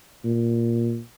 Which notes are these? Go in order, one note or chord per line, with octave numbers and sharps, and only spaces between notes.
A#2